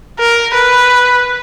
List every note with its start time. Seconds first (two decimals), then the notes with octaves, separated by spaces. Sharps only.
0.19 A#4
0.54 B4